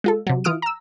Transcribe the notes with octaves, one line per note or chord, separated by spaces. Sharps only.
G#3 F4 A4
C3 F#3
E3 F4 D#6 F6 D7
A#5 E6